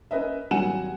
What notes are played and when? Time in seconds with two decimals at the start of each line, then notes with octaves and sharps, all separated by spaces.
0.11 C#4 A#4 B4 D#5 E5
0.51 G#1 F#3 G3 F#5 G#5 E7